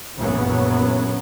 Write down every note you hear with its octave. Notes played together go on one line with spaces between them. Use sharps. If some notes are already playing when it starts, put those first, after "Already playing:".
A#1 F#2 C#3 E3 F#3 B3